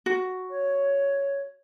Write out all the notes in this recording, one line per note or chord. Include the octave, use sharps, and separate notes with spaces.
F#4
C#5